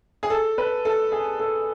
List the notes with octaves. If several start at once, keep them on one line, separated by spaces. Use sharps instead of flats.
G#4
A4
B4
A4
G#4
A4